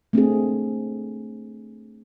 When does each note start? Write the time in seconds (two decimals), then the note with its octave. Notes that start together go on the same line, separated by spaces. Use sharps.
0.13 A3 C4 D4 G#4